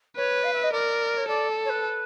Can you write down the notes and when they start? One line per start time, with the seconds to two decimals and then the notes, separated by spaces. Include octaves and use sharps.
0.16 B4 C#5
0.44 F5
0.53 E5
0.63 D#5
0.72 A#4 D5
1.17 C#5
1.28 A4 D5
1.65 C#5
1.69 B4